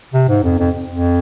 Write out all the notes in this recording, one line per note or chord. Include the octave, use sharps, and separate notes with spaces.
C3
G#2
F2
F2
F2